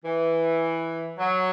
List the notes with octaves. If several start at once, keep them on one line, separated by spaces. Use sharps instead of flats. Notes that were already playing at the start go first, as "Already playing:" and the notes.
E3
F#3